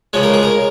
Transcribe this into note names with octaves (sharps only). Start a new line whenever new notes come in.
C#2 C#3 F3 G#3 C#5
A#4
G#4
A#4